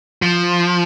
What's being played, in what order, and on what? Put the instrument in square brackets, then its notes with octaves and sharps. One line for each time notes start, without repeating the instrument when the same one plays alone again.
[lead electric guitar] F3